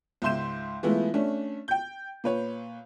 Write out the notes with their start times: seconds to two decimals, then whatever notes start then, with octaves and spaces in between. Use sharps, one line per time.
0.22 C#2 G#2 E5 C6 G6 E7
0.83 E3 G#3 A3 B3 E4 F4
1.14 A3 C#4 D4
1.68 G5 G6
2.24 A#2 B4 C#5